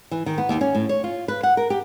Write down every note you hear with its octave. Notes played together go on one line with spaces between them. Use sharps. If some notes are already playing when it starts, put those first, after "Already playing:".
E3
D#3
B3
D#2
C#4
A2
C#5
F4
B4
F#5
A#4
G4